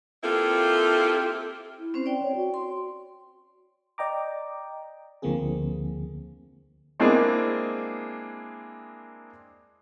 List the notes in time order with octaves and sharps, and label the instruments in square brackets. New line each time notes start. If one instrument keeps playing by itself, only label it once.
[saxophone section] A#3 C4 E4 F4 G4 A4
[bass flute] E4
[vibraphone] C4 C#4 C5
D5 G5
[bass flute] C#5
F#4
[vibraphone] C6
[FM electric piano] D5 D#5 G5 A#5 D6
D2 D3 F3 A#3 C4 G#4
[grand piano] G#3 A#3 C4 D4 E4 G#4